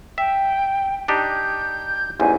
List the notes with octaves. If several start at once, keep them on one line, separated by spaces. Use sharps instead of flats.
E5 G5
D4 D#4 G4 G6
A1 E2 G#2 G#5